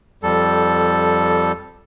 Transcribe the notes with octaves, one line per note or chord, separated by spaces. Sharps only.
F2 G3 A4